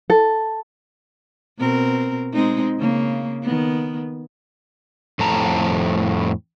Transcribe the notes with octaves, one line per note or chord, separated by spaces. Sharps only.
A4
B2 C4 A#4
G#3 C4 D#4
C#3 A#3
D#3 B3
F2 A2 A5 A#5